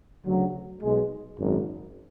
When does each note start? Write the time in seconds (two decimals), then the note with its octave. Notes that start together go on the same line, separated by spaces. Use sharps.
0.25 D2 C#3 F#3
0.82 B1 B2 G#3
1.39 G#1 F#2 C#3